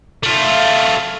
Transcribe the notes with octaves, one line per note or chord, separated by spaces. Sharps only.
A3 F4